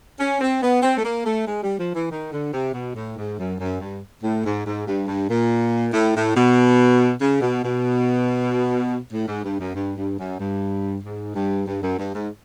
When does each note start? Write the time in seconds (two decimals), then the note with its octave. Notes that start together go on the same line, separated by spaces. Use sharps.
0.19 C#4
0.41 C4
0.62 B3
0.83 C4
0.98 A3
1.04 A#3
1.26 A3
1.46 G#3
1.63 G3
1.79 F3
1.94 E3
2.10 D#3
2.32 D3
2.53 C3
2.74 B2
2.95 A2
3.17 G#2
3.38 F#2
3.59 F#2
3.81 G2
4.23 A2
4.44 G#2
4.66 G#2
4.87 G2
5.08 G2
5.30 A#2
5.93 A2
6.15 A2
6.35 B2
7.21 C#3
7.41 B2
7.63 B2
9.11 A2
9.28 G#2
9.44 G2
9.60 F#2
9.75 G2
9.97 G2
10.18 F#2
10.39 G2
11.03 G#2
11.35 G2
11.67 G2
11.83 F#2
11.98 G2
12.14 G#2